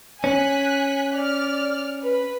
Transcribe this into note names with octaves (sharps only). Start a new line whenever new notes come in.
C#4 G#5 F#6 B6
D5 F6
B4 B5